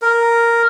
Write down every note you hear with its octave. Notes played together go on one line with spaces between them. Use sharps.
A#4